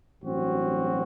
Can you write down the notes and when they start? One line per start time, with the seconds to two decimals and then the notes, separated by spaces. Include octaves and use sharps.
0.21 A1 G2 F#3 C4 F#4